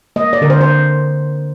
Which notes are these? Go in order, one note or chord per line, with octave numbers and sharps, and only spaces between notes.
A#3 D#5
D5
D3 A#4
C5
C5